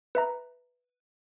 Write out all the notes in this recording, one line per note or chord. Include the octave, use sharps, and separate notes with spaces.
B4 E5 A#5